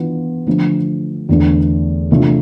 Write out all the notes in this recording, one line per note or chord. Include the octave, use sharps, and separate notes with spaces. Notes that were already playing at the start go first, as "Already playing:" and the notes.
Already playing: E3 B3 D4 F4
D3 F3 A3
E2 D3 A3 E4
C3 E3 A3 D4 F4